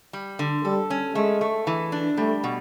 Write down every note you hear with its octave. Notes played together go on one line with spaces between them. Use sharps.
G3
D3
G3 A4
C#4
G#3 A3
A3
E3
D4
G3 A3
B2